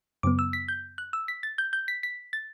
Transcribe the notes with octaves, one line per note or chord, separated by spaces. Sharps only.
F#2 C#3 F#3 B3 D6
E6
B6
G6
F#6
E6
B6
A6
G6
G6
B6
B6
A6